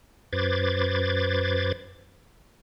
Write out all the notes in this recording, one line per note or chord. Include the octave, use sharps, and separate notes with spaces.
F#2 B4 C5 D6 G#6 A6